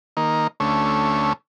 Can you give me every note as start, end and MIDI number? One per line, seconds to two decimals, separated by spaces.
0.17 0.47 51
0.17 0.47 58
0.60 1.33 38
0.60 1.33 57
0.60 1.33 61